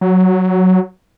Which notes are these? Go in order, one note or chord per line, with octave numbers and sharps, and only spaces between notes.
F#3